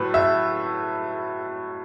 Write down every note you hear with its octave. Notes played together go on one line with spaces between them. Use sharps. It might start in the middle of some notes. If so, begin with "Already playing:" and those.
Already playing: A2 F#3 A3 B4
E5